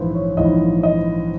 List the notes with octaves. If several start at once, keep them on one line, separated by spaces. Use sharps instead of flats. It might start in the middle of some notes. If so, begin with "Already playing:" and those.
Already playing: A#1 G#2 E3 B4 C5
C#5
A#1 G#2 E3 D#5
D#5